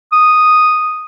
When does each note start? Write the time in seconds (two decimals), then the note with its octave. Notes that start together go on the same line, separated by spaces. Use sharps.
0.12 D#6